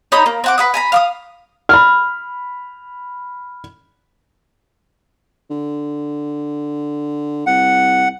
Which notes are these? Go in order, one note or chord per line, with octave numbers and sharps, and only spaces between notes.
D#4 C#5 B5 D#6
A#3
C4 F#5 D6
B4 F#5 D#6
G#5 A#5 B5
F5 D6 D#6
B5 F6
D3
C2 F#5